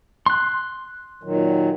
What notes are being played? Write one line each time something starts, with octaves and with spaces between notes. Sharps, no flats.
C6 F#6
A#2 D#3 F#3